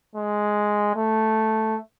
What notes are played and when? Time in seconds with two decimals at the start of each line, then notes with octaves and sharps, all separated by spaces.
0.15 G#3
0.95 A3